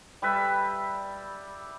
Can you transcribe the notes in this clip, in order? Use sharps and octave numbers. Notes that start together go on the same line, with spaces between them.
G3 A4 B4 E5